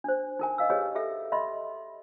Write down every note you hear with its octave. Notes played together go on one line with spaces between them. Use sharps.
D4 C5
D#4 A#4 G#5
D#5 F5 E6
G4 G#4 B4 C#5 D#5
G4 A4 E5
D#5 E5 B5 C6